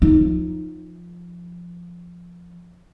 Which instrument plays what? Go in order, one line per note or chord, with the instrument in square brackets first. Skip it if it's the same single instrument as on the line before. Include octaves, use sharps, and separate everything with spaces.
[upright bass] F3 D#4